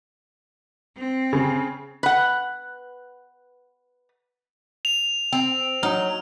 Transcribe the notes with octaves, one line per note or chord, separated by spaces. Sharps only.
C4
C#3
B4 F#5
F7
C4
F#3 D#4 F6